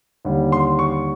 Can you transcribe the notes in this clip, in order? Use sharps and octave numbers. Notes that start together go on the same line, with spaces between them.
D#2 D3 G3
C6
C#6